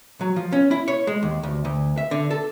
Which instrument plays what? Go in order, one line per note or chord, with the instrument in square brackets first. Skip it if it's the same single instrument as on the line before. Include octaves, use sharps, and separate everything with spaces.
[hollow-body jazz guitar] F#3
F3
C#4
E4
C#5
G#3
D#2
D2
D2
E5
D3
A4